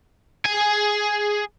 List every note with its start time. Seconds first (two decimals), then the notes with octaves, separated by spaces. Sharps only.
0.45 G#4 G#5